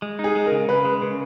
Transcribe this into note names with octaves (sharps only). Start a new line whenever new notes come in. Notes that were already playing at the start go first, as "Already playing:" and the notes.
G#3
D#4
G#4
G#3
C#3 A#4
C#3 B4
G#3
C#3